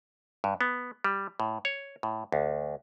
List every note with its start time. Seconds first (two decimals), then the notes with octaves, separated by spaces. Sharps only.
0.44 G2
0.61 B3
1.04 G3
1.40 A2
1.65 C#5
2.03 A2
2.32 D2